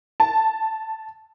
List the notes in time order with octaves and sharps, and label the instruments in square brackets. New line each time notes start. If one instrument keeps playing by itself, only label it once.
[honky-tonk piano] A5